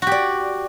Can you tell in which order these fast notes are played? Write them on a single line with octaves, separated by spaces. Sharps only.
F#4 G4 D5